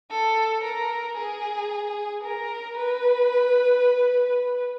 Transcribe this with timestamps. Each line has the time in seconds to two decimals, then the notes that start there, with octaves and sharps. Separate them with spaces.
0.11 A4
0.64 A#4
1.17 G#4
2.24 A#4
2.78 B4